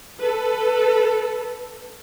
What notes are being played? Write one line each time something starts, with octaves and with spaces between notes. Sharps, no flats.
A4 B4